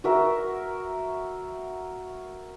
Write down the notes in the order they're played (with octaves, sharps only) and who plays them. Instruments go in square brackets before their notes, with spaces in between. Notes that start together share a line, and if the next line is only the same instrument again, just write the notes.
[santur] F#4 A#4 E5